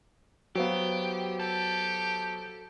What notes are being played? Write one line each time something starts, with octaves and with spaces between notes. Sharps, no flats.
F#3 B3 F#4 G4 C5 F5
G4 A4